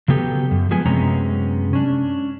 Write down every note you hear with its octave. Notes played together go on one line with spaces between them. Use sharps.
C#3 F#3 B3 G4 A4
F#2
F3 G#3 B3 G#5
F#2 C3 G#3 B3 C#4 A#5
C#4 D4